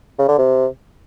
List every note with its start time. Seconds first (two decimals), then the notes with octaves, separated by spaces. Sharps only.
0.19 C#3
0.28 D3
0.38 C3